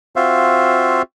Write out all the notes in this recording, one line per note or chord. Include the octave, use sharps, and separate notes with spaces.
C4 F4 F#4 C5 E5 F5